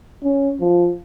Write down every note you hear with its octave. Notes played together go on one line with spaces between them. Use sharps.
C#4
F3